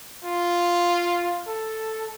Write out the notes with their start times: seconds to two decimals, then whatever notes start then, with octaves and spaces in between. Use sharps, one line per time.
0.24 F4
1.47 A4